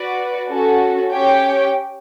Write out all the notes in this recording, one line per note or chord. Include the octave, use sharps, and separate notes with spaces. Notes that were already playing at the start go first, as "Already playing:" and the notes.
Already playing: F#4 B4 D5
C#4 F#4 A4
C#4 G4 C#5 G5